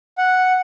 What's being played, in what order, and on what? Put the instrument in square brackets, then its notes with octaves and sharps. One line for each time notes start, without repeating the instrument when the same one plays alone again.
[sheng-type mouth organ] F#5